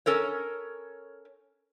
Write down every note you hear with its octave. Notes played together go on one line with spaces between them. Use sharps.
C#4 A4 A#4 C#5